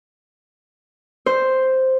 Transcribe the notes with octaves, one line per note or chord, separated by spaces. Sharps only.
C5